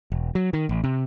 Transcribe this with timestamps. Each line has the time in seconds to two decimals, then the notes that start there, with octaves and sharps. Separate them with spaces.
0.12 E1
0.35 F#3
0.53 D#3
0.69 A1
0.84 C3